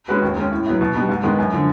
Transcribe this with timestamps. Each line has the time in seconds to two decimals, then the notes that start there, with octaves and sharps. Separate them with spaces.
0.08 G#3 C#4 F#4 B4
0.22 D#2
0.36 D#3 G#3 C#4
0.52 A2
0.66 F#3 B3 E4
0.81 B2
0.94 G3 B3 D#4
1.09 G#2
1.23 D#3 G#3 B3
1.38 F#2
1.53 D3 F3